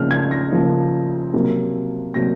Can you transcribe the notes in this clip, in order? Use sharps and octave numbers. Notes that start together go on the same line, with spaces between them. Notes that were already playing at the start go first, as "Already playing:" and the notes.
Already playing: C#3 F3 A#3 F6
G#6
A#6
C#3 F3 A#3
C3 F#3 A#3
C3 F#3 A#3 A#6